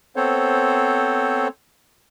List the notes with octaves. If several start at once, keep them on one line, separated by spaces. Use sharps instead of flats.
B3 C4 A4 C5 C#5